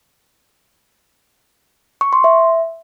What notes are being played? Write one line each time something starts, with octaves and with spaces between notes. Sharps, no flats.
C#6
C6
E5